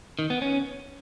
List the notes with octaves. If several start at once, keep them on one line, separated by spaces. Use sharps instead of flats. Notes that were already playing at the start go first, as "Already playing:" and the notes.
D#3
B3
C#4